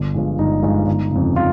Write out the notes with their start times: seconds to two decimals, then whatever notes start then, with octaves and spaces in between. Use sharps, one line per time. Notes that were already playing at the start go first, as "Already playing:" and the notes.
Already playing: G1
0.14 G2 F3 G#3
0.39 G1 D#4
0.63 G2 F3 G#3
0.87 G1
1.11 F2 C#3
1.36 F4